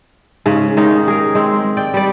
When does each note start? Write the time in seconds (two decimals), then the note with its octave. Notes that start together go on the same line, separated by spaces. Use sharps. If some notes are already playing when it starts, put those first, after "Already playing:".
0.46 G#2 C#3 C#4
0.77 D#3 G#3 C#4 D#4
1.08 G#4 A#4
1.35 G#3 C4
1.77 D5 G5
1.94 G3 D5